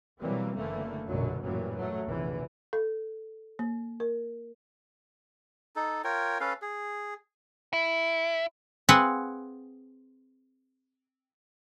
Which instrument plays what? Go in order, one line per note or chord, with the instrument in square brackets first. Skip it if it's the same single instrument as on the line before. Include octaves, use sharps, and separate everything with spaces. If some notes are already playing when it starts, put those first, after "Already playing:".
[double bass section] B2 E3 F#3 G3 A#3 C4
F#1 D3 E3 A3 A#3
A#1 F#2 B2 D3 F#3
A1 F#2 A#2 E3 F#3 G3
F#3 A3
F1 A#1 E2 D3 E3
[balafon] A4
A#3
A#4
[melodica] D#4 A4
F4 A#4 C#5 G5
C#4 A4 B4 F5
G#4
[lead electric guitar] E4
[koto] C4 G#4 B4 F5 F#5 G#5